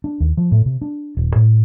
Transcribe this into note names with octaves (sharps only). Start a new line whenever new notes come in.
D4
D#2
F3
A2
C3
D4
D#1
A2